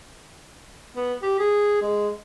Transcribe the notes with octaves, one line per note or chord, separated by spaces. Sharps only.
B3
G4
G#4
G#3